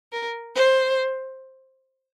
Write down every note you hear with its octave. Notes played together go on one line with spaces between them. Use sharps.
A#4
C5